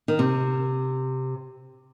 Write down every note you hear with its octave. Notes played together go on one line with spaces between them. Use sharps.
D#3
C3